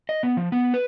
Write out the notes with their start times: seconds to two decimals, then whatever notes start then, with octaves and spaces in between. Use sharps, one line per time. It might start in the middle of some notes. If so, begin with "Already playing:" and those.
0.09 D#5
0.23 B3
0.37 F3
0.52 B3
0.74 B4